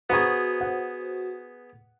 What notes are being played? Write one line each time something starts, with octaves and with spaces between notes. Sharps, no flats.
B3 F#4 G#4 C5 F#5 A#5 C#6
F#5